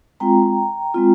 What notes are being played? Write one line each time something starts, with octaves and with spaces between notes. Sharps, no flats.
G#3 C4 F4 G5 A#5
G#3 C4 F4